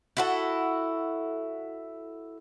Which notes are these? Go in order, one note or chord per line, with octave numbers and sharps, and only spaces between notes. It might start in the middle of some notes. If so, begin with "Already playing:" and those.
E4 F#4 A4